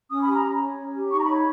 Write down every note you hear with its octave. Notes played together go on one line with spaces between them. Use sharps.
C#4 D#6
B5
G4
A#5
C#4
C#5
C#4
G4
D#4 C#6
A#5
B5
C#5